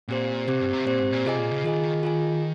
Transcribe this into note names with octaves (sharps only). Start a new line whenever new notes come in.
A#2 C4 G4 C5
C3 C4 G4 C5
G2
C3
A#2 C4 G4 C5
G#2
A#2
C3 F4 G#4 D#5 G#5
A#2
C#3
D#3 F4 G#4 D#5 G#5
F4 G#4 D#5 G#5